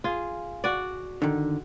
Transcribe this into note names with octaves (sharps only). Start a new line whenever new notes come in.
F4 G#4
F#4 D5
D3 D#3